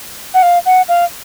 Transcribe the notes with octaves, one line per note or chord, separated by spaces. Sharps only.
F#5
F5
F#5
F5